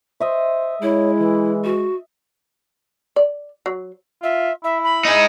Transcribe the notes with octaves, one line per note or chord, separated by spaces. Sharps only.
C5 D#5 E5
G#3 E4 C#5
E3
F#4
D5
F#3
F4 E5
E4 E5
B5
D#4 G#4